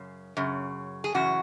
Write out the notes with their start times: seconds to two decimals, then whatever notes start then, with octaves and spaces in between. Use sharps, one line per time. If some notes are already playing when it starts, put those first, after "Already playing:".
Already playing: F#2 C#3
0.37 F#2 C#3
1.04 G#4
1.14 F#2 C#3 E3 F#4